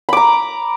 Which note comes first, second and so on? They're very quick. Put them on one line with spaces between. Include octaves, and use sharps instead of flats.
B5 D6 A#5